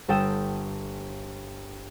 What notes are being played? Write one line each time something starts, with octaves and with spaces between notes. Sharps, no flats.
G1 A4 G5 D#6 E7